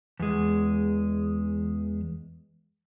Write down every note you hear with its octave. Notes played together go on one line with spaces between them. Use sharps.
E2 G#3